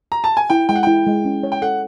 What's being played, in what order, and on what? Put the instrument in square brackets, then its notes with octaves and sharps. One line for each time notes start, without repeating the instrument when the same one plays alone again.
[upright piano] A#5
A5
G#5
[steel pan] E4 [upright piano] G5
[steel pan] G#3 [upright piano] G5
[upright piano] F#5
[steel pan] E4 [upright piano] G5
[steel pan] G#3
C#4
C#5
[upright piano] G5
[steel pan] A4 [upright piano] F#5